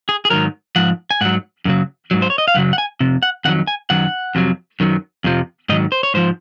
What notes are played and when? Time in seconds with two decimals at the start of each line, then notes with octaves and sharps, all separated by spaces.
0.09 G#4
0.25 G#4
0.30 G#2 D#3 F#3 A#4
0.76 G#2 F3 F#5
1.11 G#5
1.21 G#2 F#3 F#5
1.65 F#2 C#3 F#3
2.11 G#2 F#3
2.22 C5
2.30 C#5
2.38 D#5
2.48 F5
2.55 F#2 C#3 F#3 F#5
2.73 F#5
2.78 G#5
3.00 F2 C3
3.23 F#5
3.45 F2 D#3 F#3 F#5
3.67 G#5
3.90 F#2 D#3 F#3 F#5
4.35 F2 C3 F#3
4.80 F#2 D#3 F#3
5.24 F2 C3 F3
5.69 G#2 D#3 F#3 D#5
5.92 C5
6.03 C#5
6.14 G#2 F3 C5